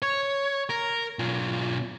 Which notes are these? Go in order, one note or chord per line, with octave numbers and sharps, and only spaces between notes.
C#5
A#4
B1 F4